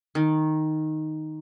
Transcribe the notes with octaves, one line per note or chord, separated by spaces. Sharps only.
D#3